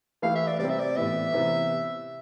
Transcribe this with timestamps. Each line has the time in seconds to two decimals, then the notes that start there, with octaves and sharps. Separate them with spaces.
0.22 E3 A3 E4 G4 B4 F5
0.35 E5
0.47 D5
0.59 C3 G3 C4 D5
0.69 E5
0.79 D5
0.96 A2 E3 B3 E5
1.32 C3 E3 B3